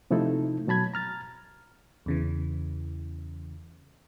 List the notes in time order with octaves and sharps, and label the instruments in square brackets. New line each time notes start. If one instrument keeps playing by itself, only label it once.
[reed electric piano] C3 F3 A3 D#4 E4 A4
B2 F#3 A5 B5 G#6
A#5 F6 A6
[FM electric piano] E2 C#3 E3